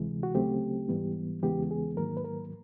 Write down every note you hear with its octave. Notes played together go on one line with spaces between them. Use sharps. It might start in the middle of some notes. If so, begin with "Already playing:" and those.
Already playing: D2 C3 E3 G#3
F#4
D2 C#3 F#3 A3 C4 G4
G#2 E3 G3 B3
E2 C#3 E3 G#3 B3 G4
G#4
G#2 D#3 F#3 A#3 A#4
B4
A#4